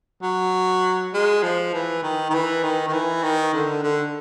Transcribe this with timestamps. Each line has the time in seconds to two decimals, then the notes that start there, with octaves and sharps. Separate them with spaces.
0.22 F#3
1.13 G#3
1.43 F3
1.74 E3
2.03 D#3
2.30 D#3
2.34 E3
2.63 D#3
2.88 D#3
2.93 E3
3.23 D#3
3.54 D3
3.83 D3